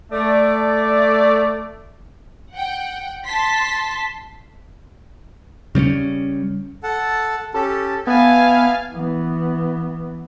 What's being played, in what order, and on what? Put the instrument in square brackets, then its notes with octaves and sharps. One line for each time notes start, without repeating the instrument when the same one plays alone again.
[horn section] A3 D5
[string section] F#5 G5
A5 C6 B6
[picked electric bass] C#3 G3 B3 C#4
[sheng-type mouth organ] A4 F#5 A5
[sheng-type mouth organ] C#4 G4 [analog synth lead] A4
[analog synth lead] B3 [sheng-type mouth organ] E5 A5 [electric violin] F5 G#5
[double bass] E3 B3